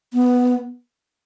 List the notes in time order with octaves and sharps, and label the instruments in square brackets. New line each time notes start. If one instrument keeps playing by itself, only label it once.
[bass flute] B3